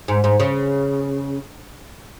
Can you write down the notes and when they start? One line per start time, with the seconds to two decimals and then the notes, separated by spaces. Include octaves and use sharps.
0.08 G#2
0.24 G#2
0.40 C#3